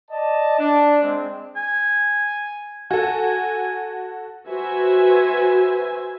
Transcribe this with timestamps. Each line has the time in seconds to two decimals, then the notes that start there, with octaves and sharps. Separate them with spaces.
0.11 D5 D#5 A5
0.59 D4
1.02 G#3 C4
1.56 G#5
2.90 F#4 A4 G#5
4.48 F#4 B4 C5 E5 G#5